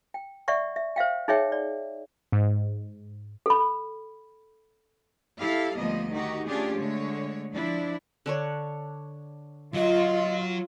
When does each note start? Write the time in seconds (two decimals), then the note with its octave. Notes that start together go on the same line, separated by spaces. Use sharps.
0.14 G5
0.48 D5 E5 F#5 C#6
0.76 E5
0.96 C5 E5 F5 G5
1.28 D#4 G#4 C#5 E5 G5
1.52 D5
2.32 G#2
3.46 A4 B5
5.40 E4 G4 A4 F5
5.77 D2 F3 G3 A#3 B3 D#5
6.10 D#3 D#4 F#4 G4
6.47 A3 C#4 D4 F4 G4 G#4
6.77 D3 G#3 A3 C#5
7.53 F3 D4 E4
8.26 D3 D4 C#5
9.75 F#3 F4 F#4 D#5